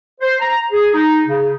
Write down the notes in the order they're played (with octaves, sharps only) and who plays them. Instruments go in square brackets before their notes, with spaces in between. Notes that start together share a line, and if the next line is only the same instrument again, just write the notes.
[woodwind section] C5
A#5
G#4
D#4
C#3